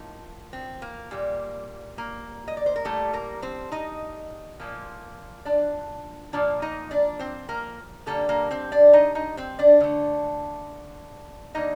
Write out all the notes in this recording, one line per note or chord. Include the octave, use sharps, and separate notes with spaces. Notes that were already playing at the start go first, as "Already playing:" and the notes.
Already playing: A2 F3 A#3 D#4
C4
A#3
A#2 G3 A#3
A#3
D#5
D5
C5
A#4
A2 G3 A3 A#3 A4
A#3 A#4
C4 C5
D#4 D#5
A#2 F3 A#3
D4 D5
A#2 F3 A#3 D4 D5
D#4 D#5
D4 D5
C4 C5
A#3 A#4
D3 G3 A3 A#3 A4
A#3 A#4
C4 C5
D4 D5
D#4 D#5
D#4 D#5
C4 C5
D4 D5
D3 A3
D3 G3 A#3 D#4 D#5